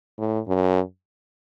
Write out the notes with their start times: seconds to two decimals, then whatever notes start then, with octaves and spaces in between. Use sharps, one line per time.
0.18 A2
0.48 F#2